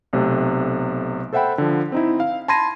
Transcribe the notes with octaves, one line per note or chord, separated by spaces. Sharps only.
B1 C3 A3
A4 C5 E5 F#5 G5 B5
D3 F3
C4 D#4 E4
F5
A5 B5 C6 G#6 A#6 D#7